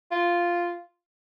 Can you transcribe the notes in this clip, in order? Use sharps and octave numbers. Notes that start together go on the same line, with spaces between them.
F4